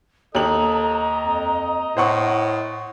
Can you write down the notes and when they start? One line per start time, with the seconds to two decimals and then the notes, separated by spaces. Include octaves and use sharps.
0.35 D#2 A4 D#5 A#5 F#7
1.20 F2
1.97 A2 C5 F#5 C#6